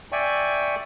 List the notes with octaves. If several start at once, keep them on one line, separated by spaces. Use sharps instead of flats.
D5 E5 G5 G#5 C#6